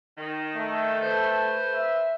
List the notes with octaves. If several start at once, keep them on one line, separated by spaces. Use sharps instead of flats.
D#3
A3
B4 C5
E5